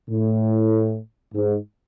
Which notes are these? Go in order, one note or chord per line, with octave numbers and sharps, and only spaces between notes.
A2
G#2